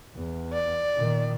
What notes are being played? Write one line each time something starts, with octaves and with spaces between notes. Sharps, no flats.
E2
D5
A#2 D#3